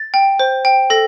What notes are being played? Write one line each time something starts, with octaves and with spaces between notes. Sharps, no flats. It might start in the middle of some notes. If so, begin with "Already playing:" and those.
Already playing: A6
G5
C5
G5
A4 A#6